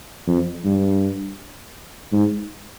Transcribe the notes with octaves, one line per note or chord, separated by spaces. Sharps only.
F2
G2
G#2